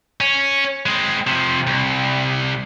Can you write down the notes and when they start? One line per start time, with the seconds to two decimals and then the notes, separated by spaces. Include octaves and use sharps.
0.20 C#4
0.86 G#3 C4
1.27 C3 F3
1.67 C2